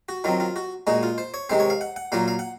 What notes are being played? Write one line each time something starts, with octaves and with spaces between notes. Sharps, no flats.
F#4
D#3 F#3 C4 F4
F4
F#4
A#2 G#3 D#4 F#4
F4
C5
C#5
C3 D#3 G#3 C4 C5
C#5
F5
F#5
F#5
A#2 F#3 A#3 F4 F5
F5
F#5